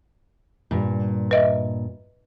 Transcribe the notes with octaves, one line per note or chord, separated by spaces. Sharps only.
G2 A#2
B4 D#5 E5